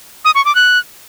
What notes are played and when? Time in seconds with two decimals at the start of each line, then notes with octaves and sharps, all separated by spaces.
0.25 D#6
0.35 C#6
0.45 D6
0.55 F#6